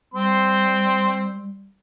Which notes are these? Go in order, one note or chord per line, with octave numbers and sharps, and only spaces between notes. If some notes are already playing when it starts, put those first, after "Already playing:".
G3 C4 C6